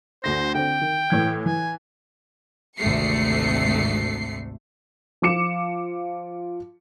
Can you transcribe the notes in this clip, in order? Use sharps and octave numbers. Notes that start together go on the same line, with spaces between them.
D2 D3 C5 A#6
D3 C4 G5
D#3
A2 E3 G#6
E3 G#5
G#1 D2 C3 A3 C7 C#7
F3 F4 D6 C#7 E7